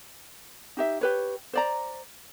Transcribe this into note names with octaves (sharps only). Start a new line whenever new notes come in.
D#4 G4 E5
G4 B4 C#5
C5 D5 A#5